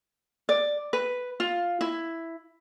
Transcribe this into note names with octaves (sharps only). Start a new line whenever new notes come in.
D5
B4
F4
E4